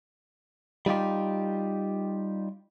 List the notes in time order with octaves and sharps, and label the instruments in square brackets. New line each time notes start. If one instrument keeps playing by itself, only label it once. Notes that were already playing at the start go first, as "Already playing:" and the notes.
[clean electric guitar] G3 D#4 F4 G4